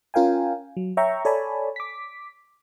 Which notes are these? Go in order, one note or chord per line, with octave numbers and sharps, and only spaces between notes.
C#4 F4 A#4 F5 G5 G#5
F#3
C#5 E5 G5 A#5 C#6
A4 C#5 D5 G#5 A5 B5
D6 B6